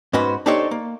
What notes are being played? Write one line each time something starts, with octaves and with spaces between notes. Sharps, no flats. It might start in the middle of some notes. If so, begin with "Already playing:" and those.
G#2 C#4 F#4 B4 C5
D4 D#4 G4 A4 C5 C#5
A#3